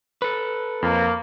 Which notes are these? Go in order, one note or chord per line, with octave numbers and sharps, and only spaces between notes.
A4 B4
F2 A#3